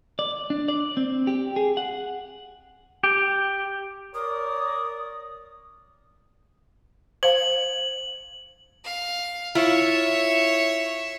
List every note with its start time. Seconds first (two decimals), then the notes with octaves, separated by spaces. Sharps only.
0.19 D5
0.50 D4
0.68 D5
0.97 C4
1.27 G4
1.56 G#4
1.77 F#5
3.03 G4
4.14 A#4 C#5 D5 D#6
7.23 C5 F5 F#7
8.84 F5
9.55 E4 F4 C#5 E5